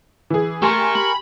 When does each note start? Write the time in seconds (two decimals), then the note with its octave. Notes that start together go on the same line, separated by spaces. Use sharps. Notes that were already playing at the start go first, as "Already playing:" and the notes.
0.30 E3 G#4
0.62 A3 G4 A#4 G#5 C6 C#6
0.95 B5